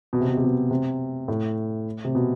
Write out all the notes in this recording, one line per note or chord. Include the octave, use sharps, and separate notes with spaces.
B2
C3
B2
C3
B2
C3
A2
C3
B2